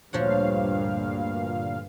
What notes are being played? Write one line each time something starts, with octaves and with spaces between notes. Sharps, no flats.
D2 G2 A#2 F3 C#5 F5 F#5